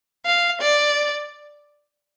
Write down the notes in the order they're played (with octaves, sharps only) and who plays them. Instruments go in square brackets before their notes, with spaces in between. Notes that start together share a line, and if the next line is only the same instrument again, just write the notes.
[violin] F5
D5